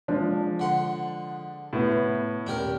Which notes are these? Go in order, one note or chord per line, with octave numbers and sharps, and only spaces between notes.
F3 G#3 D4
D3 F#5 C6
A2 B3
D#1 D4 G4 A#4